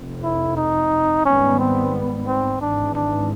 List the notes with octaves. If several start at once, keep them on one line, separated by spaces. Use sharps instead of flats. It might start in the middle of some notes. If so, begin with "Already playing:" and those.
Already playing: F1 F2 C3
E4
D#4
G#2 D#3 G3 B3 C#4
C4
C4
G#1 G#2 E3 D4
D4